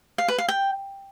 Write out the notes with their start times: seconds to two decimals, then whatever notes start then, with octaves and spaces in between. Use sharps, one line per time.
0.18 F5
0.28 B4
0.38 F5
0.48 G5